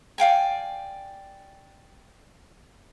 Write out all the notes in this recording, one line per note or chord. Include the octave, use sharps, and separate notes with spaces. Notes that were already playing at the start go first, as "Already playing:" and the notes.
D5 F5 G5 G#5